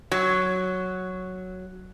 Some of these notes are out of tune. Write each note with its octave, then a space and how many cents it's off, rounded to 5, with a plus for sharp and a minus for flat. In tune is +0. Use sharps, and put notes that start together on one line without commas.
F#3 +0